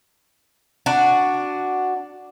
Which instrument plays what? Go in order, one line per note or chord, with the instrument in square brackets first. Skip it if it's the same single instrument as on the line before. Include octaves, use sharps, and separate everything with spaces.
[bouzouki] D4 F#4